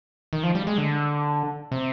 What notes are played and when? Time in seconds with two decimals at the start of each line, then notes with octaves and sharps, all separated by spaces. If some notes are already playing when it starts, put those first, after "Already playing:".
0.33 D#3
0.43 F3
0.55 G3
0.67 G#3
0.78 D3
1.72 C3